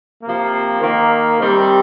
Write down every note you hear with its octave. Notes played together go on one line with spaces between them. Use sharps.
C3 F3 A#3
D#3 A#3
C3 D#3 G3 C4